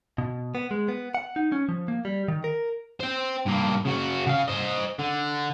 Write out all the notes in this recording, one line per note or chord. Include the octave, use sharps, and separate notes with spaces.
B2
B3
G#3
B3
F#5
D#4
C#4
F3
A#3
G3
D#3
A#4
C5 G5
G2 A#3
C#3 F#4
C#3 F5
C5 D#5
D3